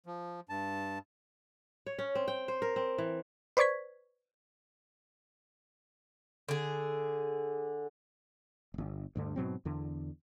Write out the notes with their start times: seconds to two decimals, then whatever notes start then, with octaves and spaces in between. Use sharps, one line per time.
0.06 F3
0.49 G2 A5
1.87 C#5
1.99 C#4
2.15 C4
2.28 G5
2.48 C5
2.62 A#4
2.76 C4
2.98 E3
3.57 B4 C5 D5 C#6 G#6 B6
6.49 D3 G#4
8.74 D1 G1
9.16 D2 G2 D3
9.36 G#2 B2 F#3 C4
9.65 E2 D3